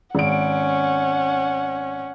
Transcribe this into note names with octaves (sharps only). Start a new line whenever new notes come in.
G#1 C#4 F#5 D7